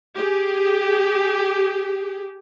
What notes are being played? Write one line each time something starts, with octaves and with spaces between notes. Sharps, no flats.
G4 G#4